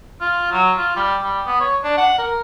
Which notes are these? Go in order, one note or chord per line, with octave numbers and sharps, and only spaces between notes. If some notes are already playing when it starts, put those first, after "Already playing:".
F4
F#3
F4
G3
G3
B3
C#5
D4
F#5
A#4